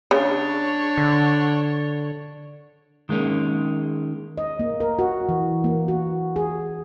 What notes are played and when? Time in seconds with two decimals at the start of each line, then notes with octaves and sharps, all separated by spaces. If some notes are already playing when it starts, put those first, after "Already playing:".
0.11 C#3 D4 C#5
0.98 D3
3.09 D#3 G#3 A#3 C#4
4.38 D#5
4.59 A#3
4.80 A#4
4.99 F#4
5.29 E3
5.64 A#3
5.88 F#4
6.36 G#4